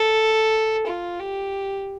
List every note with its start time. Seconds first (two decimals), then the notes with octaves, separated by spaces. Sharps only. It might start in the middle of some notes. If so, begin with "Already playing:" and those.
Already playing: A4
0.86 F4
1.19 G4